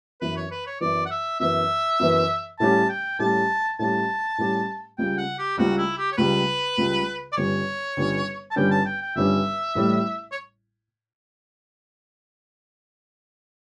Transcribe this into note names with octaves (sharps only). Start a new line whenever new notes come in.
F#2 E3 B3 B4
C#5
B4
C#5
F#2 E3 B3 D5
F#5
E5
F#2 E3 B3 E5
F#2 E3 B3
A2 G3 C#4 G4 A5
G5
A2 G3 C#4 G4 A5
A2 G3 C#4 G4 A5
A2 G3 C#4 G4
C#2 C#3 G3 G5
F#5
G4
C#2 C#3 G3 F#4
E4
G4
C#5
C#2 C#3 G3 B4
C#2 C#3 G3
D5
G1 G2 D3 G3 C#4 C#5
G1 G2 D3 G3 C#4
A5
G1 G2 D3 G3 C#4 G5
A5
G5
G5
G1 G2 D3 G3 C#4 E5
A1 A2 G3
C#5